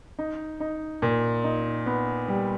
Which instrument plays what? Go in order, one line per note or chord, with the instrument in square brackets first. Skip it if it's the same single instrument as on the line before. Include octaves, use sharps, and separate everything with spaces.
[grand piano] D#4
D#4
A#2
D#4
B3
G3